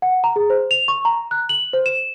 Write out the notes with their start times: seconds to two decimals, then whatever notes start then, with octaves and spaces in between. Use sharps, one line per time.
0.02 F#5
0.24 A#5
0.36 G#4
0.50 C5
0.71 F7
0.88 C#6
1.05 A#5
1.31 F#6
1.49 F#7
1.73 C5
1.86 E7